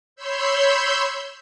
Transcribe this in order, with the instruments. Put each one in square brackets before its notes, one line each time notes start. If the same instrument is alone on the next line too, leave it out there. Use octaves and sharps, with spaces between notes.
[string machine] C#5 B5 C6 E6 G6